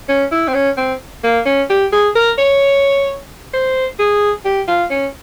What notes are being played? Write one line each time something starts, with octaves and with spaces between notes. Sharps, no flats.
C#4
E4
C4
C#4
C4
A#3
C#4
G4
G#4
A#4
C#5
C5
G#4
G4
F4
C#4